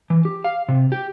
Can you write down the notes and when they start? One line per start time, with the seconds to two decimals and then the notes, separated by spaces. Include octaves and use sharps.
0.10 E3
0.25 G4
0.44 F5
0.69 C3
0.92 G4